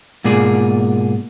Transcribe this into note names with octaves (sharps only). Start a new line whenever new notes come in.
G#2 B2 A#3 F4 G#4 D5